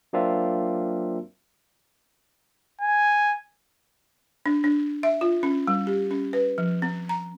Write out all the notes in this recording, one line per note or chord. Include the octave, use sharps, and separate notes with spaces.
F#3 A#3 C4 D4 F4 E5
G#5
D4
D4
E5
F4
C#4
G3
G4
C#4
B4
F3
C4
A#5